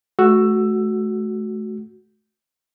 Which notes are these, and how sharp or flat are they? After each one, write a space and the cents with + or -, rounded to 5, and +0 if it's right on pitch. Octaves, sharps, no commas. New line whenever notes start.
A3 -35 F#4 +0 E6 +10